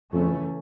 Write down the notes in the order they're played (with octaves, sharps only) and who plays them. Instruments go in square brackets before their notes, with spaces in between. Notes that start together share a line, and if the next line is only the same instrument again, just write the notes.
[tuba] F2 [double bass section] C#3 E3 A3 C#4